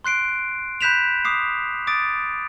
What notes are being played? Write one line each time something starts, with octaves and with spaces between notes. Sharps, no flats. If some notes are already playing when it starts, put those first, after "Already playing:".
C6 F#6 C7 D7
B5 F#6 G6 B6 E7 F7
D6 D#6 C7
D6 D#6 A6 D7